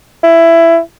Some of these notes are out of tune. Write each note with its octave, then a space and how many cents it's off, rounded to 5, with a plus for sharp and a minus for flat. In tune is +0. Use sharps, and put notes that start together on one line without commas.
E4 +15